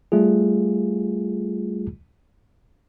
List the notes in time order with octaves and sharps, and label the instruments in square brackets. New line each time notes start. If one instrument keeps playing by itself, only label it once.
[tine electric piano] G3 A3 F4 G#4